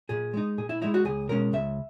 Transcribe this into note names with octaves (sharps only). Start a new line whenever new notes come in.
A#2 G#4
G#3 D#4
A#2 G#4
E4
G#3 D#4 E4
F#4
C#2 G#4
B2 G#3 C#4 A#4
C#2 E5